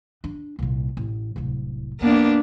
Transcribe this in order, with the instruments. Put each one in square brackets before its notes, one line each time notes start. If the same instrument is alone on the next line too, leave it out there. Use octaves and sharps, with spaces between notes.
[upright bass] D4
C2 A#2
A1
D1 C2
[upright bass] F2 [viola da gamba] A#3 B3 D4